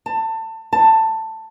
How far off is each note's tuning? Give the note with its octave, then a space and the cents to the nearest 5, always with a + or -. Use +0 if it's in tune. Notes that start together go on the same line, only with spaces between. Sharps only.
A5 +25
A5 +15